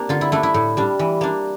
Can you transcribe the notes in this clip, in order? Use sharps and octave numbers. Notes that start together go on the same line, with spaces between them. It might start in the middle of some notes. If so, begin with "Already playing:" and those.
Already playing: A#3 C4 D4 G4
D3 F4
E4
A3 D4 E4
E4
A2
G3 D4
E3
A#3 D4